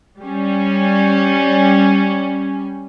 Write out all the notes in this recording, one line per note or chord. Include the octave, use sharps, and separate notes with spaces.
G3 C#4